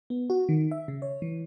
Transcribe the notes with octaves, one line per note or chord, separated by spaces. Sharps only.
B3
F#4
D#3
E5
C#3
C#5
E3